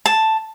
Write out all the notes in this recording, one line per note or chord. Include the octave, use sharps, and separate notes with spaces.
A5